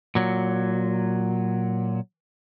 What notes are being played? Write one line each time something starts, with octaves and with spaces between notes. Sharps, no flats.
A#2 F#3